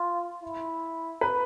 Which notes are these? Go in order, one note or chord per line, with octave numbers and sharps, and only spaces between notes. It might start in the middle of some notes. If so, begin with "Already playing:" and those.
Already playing: F4
E4
B4